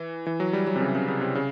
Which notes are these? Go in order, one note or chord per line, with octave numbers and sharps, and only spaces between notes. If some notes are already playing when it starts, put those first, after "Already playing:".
Already playing: E3
E3
F#3
G3
F#3
C3
C#3
C#3
C#3
C3
C#3